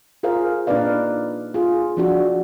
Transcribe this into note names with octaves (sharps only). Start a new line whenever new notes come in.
F4 G#4 A#4 C5 F5
A#2 D4 D#4 B4 D5 F5
F4 G#4
F3 D4 F#4